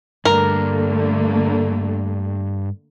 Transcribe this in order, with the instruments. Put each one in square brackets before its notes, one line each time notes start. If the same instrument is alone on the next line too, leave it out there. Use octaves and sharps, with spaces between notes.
[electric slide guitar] G2 [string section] D3 A3 A#3 [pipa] A#4